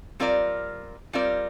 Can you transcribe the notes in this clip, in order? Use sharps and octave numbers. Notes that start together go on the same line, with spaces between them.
G3 C4 F4 A#4 D5
G3 C4 F4 A#4 D5